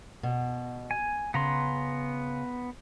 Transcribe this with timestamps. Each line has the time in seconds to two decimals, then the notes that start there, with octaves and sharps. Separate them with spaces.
0.23 B2
0.91 G#5
1.34 C#3 B3 A#5 C6